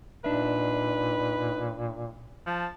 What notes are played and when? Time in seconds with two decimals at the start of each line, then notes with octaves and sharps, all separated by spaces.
0.24 A#2 D4 D#4 B4 E5
2.46 F3 A5